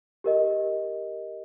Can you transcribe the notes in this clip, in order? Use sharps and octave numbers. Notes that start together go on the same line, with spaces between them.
G4 A#4 D#5